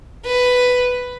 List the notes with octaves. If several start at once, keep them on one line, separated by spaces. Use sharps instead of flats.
B4